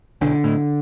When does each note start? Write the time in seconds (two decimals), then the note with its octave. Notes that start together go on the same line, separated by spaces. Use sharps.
0.21 B1 D3
0.44 A2